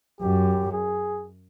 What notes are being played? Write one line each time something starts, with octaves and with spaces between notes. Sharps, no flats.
F#2 G4
G#4